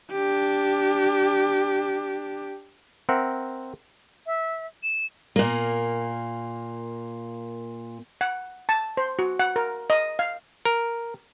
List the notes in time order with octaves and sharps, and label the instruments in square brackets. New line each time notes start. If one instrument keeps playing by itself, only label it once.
[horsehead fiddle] D4 G4
[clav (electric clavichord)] C4 A#4 E5 F#5
[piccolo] E5
E7
[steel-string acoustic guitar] A#2 A#3
[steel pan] F#5
A5
C5
F#4
F#5
A#4
D#5
F5
[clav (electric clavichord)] A#4